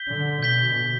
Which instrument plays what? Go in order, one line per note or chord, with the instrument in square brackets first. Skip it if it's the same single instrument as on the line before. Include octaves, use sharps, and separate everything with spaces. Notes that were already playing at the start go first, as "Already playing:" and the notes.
Already playing: [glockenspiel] G6 B6 G7
[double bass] D3
[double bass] B2 [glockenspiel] G6 B6 G7